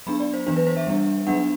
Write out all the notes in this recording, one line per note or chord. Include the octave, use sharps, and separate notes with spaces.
F#3 B3 D4 B5
D5
C5
E3 B3 D4 C5
B4
C5
E5
G3 B3 D4
F#3 B3 D4 F#5